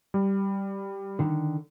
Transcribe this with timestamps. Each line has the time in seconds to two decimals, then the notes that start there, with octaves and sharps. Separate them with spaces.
0.14 G3
1.19 D3 D#3